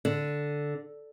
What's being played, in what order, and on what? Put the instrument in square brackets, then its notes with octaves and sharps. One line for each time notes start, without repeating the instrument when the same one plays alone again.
[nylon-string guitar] D3